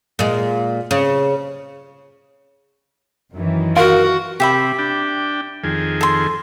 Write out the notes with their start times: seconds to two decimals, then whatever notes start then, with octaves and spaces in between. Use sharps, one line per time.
0.19 A#2 G#3
0.91 C#3
3.32 F#2 D#3 E3
3.77 F4 F#4 A#4
4.40 C3 G4 E5 B5
4.78 D4 G5
5.64 F2 D#3 G#4
6.01 A4 C6